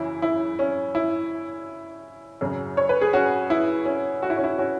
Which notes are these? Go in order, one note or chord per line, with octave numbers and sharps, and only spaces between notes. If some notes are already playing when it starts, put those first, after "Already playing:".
Already playing: F#2 C#3 E3 E4
E4
C#4
E4
F#2 C#3 F#3
C#5
B4
G#4
C#4 F#4
E4
C#4
F#4
E4
C#4
E4
C#4 F#4